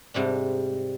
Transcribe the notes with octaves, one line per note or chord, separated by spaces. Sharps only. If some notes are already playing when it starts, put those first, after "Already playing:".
G#2 C3 G3 D4